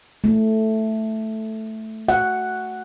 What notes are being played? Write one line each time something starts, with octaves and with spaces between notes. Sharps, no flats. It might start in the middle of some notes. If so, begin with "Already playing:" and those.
A3
F#5